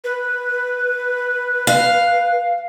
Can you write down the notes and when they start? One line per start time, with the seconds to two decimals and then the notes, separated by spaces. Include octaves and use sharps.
0.04 B4
1.67 F5